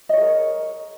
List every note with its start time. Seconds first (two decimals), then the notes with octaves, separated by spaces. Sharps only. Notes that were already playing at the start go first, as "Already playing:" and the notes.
0.09 D#5
0.13 C#5
0.17 G#4
0.21 A#4